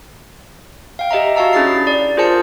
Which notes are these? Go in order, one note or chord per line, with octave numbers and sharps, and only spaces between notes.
F5 G5
G4 D#5 E5 A#5
F#4 G4 F5 A5 A#5 E6
C#4 D4 E4 G#4 A6 C7
D5
F4 G#4 A#4 C5 A5 C#7